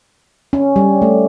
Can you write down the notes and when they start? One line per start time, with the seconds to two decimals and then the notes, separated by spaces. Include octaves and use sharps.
0.53 C#4
0.76 G3
1.02 A3